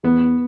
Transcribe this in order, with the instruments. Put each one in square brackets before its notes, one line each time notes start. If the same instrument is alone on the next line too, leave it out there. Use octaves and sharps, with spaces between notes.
[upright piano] E2 [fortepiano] B3